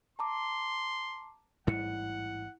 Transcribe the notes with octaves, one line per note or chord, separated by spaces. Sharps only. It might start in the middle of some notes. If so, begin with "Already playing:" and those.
A5 A#5 C6 D6
A1 G#2 G3 E4 F#5 C#7